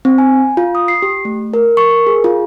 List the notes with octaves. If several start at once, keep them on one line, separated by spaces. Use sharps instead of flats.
C4
G#5
F4
D#6
C7
G4
A3
A#4
C#6
A#4
G#4
F4